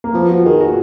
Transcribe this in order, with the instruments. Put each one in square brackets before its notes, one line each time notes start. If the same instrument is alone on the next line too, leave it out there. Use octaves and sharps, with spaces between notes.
[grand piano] A#3
[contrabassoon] F3 [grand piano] B3
[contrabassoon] F3 [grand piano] F#4
[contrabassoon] D#3 [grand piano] G#4
[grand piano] F#4
[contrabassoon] A#2